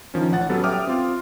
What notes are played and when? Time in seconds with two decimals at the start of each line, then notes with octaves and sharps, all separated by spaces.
0.14 D#3 F3 C#4
0.32 A1 F#5 A6
0.49 F#3 G3 B3 C#4 A4
0.64 E5 G5 D6 D#6 F6
0.87 C4 F4